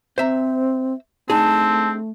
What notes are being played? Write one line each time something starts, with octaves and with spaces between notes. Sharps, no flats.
C4 C5 E5 A#5
A3 C4 D4 D#4 G#4 A5